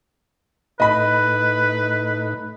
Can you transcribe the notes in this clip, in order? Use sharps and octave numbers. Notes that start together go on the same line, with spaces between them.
A2 D#4 B4 D#5 B5